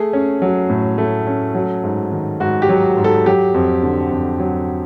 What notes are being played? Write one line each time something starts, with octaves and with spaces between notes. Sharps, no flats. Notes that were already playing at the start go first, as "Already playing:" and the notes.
Already playing: A3 G#4
C#4
F#3
A2
A3
C#4
F#3
G#2
D#3
G#2 F#4
G4
F#3
G#2
A4
F#3 G4
F2
D3
F2
F#3